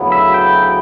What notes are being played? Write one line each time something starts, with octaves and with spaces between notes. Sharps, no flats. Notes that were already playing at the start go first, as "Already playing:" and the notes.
Already playing: D2 C#3 F#3 B3 E4
E5
G5